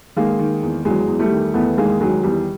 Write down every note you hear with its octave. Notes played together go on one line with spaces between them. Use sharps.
D#3 G#3 A#3
D#3
E2
E2 F#3 G#3
E2
G3 A3
D#3
E2 A3 B3
D#3 G#3 A#3
D#3 F#3 G#3
E2 G3